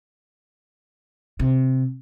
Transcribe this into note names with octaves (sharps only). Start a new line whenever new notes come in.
C3